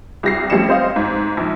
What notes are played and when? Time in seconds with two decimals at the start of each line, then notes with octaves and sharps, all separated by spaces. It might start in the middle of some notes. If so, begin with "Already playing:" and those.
0.23 C2 G3 A#6 C7
0.50 F2 G3 A3 C#4 C#7 E7
0.69 C4 C5 D#5 F5
0.96 G#2
1.37 A#1